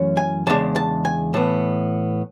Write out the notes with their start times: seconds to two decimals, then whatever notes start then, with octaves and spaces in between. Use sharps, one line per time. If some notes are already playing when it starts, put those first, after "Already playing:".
Already playing: F#2 E3 A3 C#4 E4
0.17 G#5
0.47 E2 C#3 G#3 D4 A5
0.76 A5
1.05 G#5
1.34 A2 E3 B3 A5